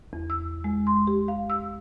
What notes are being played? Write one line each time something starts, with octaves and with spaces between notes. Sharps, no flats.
E2
E6
G#3
C6
G4
F5
E6